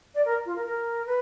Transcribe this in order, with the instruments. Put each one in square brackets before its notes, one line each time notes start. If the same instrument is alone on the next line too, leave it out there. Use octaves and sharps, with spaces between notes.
[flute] D5
A#4
F4
A#4
A#4
B4